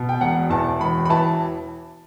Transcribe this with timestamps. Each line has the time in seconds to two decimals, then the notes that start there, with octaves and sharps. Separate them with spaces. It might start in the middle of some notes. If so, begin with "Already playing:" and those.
Already playing: B2
0.09 G5
0.20 E1 F#5
0.50 E2 A5
0.80 E1 B5
1.05 B5
1.10 E3 A5